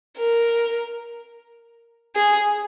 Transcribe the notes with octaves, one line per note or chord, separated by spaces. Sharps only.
A#4
G#4